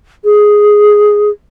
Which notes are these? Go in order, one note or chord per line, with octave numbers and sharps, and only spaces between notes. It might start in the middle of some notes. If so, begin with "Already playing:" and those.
G#4